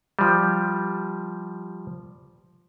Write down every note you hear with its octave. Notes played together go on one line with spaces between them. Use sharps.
F3 G3